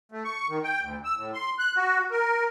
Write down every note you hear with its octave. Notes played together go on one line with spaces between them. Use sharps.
A3
C#6
D#3
G5
D2
E6
A2
C6
F#6
F#4
A#4